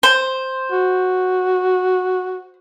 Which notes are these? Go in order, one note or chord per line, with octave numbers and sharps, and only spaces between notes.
C5
F#4